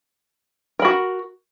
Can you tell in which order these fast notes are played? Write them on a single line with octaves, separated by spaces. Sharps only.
A#4 B5 F#4